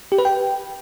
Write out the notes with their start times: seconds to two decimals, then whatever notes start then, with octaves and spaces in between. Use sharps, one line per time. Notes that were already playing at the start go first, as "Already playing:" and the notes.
0.12 G4
0.18 B4
0.25 G5